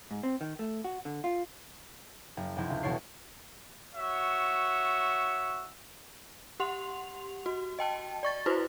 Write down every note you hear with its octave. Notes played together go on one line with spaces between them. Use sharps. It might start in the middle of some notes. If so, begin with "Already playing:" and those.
G#2
C4
D#3
A3
F#4
D3
F4
F#1
F1 C3 C4 E4 G6
C#2
E1 B2 E4 A4 C#5 C7
F#4 C#5 E5
G4 F#5 C6 F7
F#4
D#5 G5 A5
D5 C#6 A6
E4 F#4 B4 C5